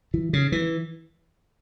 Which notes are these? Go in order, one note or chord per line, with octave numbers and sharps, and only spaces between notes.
E3
C#3
E3